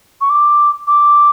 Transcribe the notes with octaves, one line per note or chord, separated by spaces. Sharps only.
C#6
D6
D6